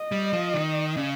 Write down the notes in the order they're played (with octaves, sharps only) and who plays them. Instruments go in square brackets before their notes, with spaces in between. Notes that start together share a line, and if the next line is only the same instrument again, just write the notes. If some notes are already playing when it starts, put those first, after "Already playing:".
Already playing: [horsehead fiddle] D#5
[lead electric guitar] G3
F3
D#3
C#3